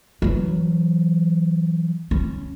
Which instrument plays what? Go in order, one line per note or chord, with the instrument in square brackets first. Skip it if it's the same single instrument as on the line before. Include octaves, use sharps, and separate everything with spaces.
[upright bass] E3 F#3
C#4